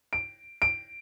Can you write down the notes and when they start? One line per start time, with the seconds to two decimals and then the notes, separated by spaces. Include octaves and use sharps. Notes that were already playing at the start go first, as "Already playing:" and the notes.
0.13 D7
0.62 D7